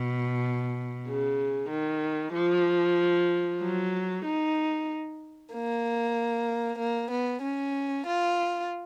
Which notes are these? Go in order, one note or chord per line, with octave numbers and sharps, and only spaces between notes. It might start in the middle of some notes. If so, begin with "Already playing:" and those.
Already playing: B2
C#3
D#3
F3
F#3
D#4
A#3
A#3
B3
C#4
F4